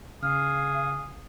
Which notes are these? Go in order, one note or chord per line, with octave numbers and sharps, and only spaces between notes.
C#3 G#4 F5 F6